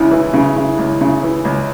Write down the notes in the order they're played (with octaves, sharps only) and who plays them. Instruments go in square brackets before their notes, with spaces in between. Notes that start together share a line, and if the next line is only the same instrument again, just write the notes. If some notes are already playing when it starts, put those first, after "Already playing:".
Already playing: [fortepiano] C#2 C#3 [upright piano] E4
[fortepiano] E3
C#3
C#3
C#2
C#3
E3
C#2